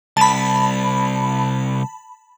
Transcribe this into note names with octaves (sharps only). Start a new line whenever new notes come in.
C2 A5 B5